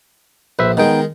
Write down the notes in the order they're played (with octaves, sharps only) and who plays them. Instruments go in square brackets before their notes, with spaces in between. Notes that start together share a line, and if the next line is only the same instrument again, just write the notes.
[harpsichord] A#1 [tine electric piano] B4 C5 E5
[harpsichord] D#3 G#3 [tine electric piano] B3 D#4 G5